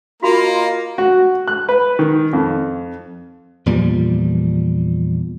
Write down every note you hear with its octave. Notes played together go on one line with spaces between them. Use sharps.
A#3 D#4 F4 F#4 E5 F5 A#5 B5
F#4
F#6
B4
D#3
F2
E2 A#2 F3 G3